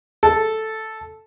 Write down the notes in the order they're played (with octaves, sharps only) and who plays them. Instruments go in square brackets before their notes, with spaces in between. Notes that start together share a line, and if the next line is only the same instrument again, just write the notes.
[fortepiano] A4